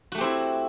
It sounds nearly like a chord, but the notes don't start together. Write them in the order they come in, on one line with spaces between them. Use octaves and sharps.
F#4 A3 G4 C4 E4